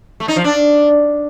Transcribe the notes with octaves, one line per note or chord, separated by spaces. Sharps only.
A3
D#4
F3
D4